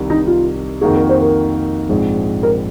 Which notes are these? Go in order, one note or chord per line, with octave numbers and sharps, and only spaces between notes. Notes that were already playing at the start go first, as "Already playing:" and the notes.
Already playing: C2 C3 D#3
D#4
F4
F2 D#3 A#3 D#4 F#4 G#4
A#4
C5
A#4
A#1 G#2 F3 G#3 C4
A#4